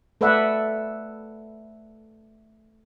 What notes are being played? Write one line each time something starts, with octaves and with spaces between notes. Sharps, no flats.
A3 A4 B4 D5 E5 F#5